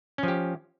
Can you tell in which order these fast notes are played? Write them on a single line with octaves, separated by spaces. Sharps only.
C#4 F3 G4